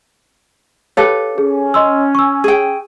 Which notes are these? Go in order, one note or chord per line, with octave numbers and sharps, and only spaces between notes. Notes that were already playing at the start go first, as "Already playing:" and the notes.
G4 A4 B4 C#5 F5
C#4 G#4
D#5 C6 E6
C#6 E6
G#4 G5